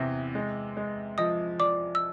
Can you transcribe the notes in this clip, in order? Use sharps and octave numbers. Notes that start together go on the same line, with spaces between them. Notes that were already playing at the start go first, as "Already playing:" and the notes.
Already playing: E2 C3
G#3
G#3
F3 D#5 D#6
F3 D5 D6
E6